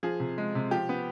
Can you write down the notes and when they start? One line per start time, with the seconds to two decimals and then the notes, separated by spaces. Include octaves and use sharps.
0.03 F3 G#4
0.20 C3
0.38 G#3
0.55 C3
0.71 F3 G4
0.89 B3